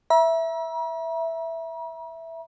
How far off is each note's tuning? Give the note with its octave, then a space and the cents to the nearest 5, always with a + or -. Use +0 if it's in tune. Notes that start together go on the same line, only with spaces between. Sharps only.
E5 +0 A#5 +45